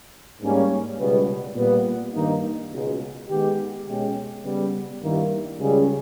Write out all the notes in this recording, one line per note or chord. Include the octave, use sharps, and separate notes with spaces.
G#2 G3 A#3 C#4
C#2 B2 G3 B3
A#2 G3 B3
G2 D#3 A#3 D#4
C#2 B2 G#3
D#3 G#3 B3 G4
B2 G#3 C#4 G4
C#3 G3 B3
G2 D#3 G3 A#3 E4
C#2 C#3 G3 C#4 G#4